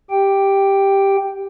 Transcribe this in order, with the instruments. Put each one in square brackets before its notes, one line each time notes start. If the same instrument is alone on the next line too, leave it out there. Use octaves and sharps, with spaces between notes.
[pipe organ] G4 G5